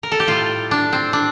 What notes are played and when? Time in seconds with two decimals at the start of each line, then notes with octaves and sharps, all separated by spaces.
0.03 A#4
0.12 A4
0.20 G4
0.27 A2 G3 F4
0.71 D4
0.93 C4
1.13 D4